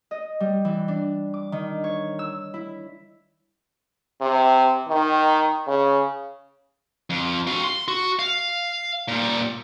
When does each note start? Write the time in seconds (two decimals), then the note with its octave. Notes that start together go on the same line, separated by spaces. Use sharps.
0.11 D#5
0.40 G3
0.65 E3
0.88 D4
1.34 D6
1.52 D#3
1.84 C#5
2.19 E6
2.54 E4
4.21 C3
4.89 D#3
5.67 C#3
7.10 F2
7.47 F#4 F5
7.64 C6
7.88 F#4
8.19 F5
9.08 A#2 G3